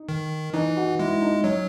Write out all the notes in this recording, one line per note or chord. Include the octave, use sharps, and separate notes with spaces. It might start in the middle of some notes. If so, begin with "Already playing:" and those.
Already playing: D#4
D#3
E3 D#4
F#4
G#3 E4
D#4
F#3 C#4